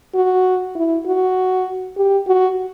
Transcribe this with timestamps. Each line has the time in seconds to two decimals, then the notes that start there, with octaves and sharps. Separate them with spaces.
0.15 F#4
0.76 E4
1.06 F#4
1.97 G4
2.27 F#4